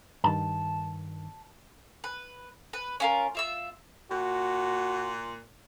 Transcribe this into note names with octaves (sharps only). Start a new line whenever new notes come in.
G2 D#3 A5
B4
B4
C#4 F4 A#4
F4 E5 E6
A#2 F#4